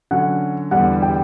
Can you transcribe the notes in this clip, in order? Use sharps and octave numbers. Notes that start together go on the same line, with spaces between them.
D3 F#3 C#4 F#5
E2 D3 G3 F#5
G5